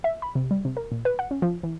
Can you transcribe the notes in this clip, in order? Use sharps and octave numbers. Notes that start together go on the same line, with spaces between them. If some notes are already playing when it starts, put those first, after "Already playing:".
E5
B5
C3
G3
C3
A#4
A#2
B4
F#5
C#4
F3
E3